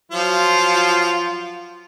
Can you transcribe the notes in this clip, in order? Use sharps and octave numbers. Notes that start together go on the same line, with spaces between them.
F3 F#3 F4